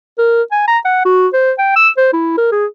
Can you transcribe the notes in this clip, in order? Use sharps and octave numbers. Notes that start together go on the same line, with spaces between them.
A#4
G#5
A#5
F#5
F#4
C5
G5
E6
C5
E4
A#4
G#4